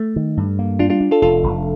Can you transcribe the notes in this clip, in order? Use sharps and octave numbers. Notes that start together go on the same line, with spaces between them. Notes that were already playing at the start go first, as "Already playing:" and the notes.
Already playing: A3
D#3
G2
A#3
G3 D4 F4
D4 F4
D4
F4 A4
F1 F4 A4
F1